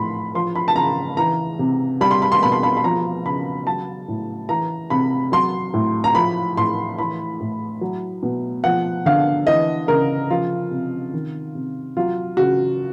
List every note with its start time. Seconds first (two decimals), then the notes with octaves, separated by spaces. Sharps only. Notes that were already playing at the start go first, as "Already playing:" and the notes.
Already playing: A2 F3 B5 C6
0.35 F3 C6
0.55 B5
0.68 A5
0.76 C#3 A#5
1.17 E3 A#5
1.59 C3
2.01 G3 B5
2.11 C6
2.22 B5
2.32 C6
2.42 B2 B5
2.52 C6
2.63 B5
2.77 B5
2.84 F3 A#5
3.25 C#3 B5
3.67 F#3 A5
4.08 A2
4.49 E3 A#5
4.90 C3 B5
5.32 F#3 C6
5.74 A2
6.04 A#5
6.15 F3 B5
6.57 A2 C6
6.98 E3 B5
7.40 A2
7.81 F#3
8.23 B2
8.64 F3 F#5
9.06 D3 F5
9.47 E3 D#5
9.88 C#3 A#4
10.30 F3 F4
10.71 C3
11.13 D#3
11.55 C3
11.97 F#3 F4
12.37 C#3 F#4